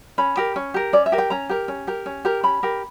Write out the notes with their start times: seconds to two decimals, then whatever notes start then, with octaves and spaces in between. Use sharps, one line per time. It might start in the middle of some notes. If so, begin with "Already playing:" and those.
0.18 C#4 B5
0.37 G4 A#4
0.56 C#4
0.74 G4 A#4
0.93 C#4 D5
1.06 E5
1.12 G4 A#4
1.18 G5
1.30 C#4 A#5
1.49 G4 A#4
1.68 C#4
1.87 G4 A#4
2.06 C#4
2.25 G4 A#4
2.43 C#4 B5
2.63 G4 A#4